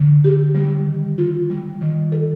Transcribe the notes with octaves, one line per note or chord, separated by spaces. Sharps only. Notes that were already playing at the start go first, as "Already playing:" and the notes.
Already playing: D3
G4
G3
D#3
F4
G3
D#3
A4